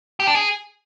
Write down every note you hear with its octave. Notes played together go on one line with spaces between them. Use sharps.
G4
D4
G#4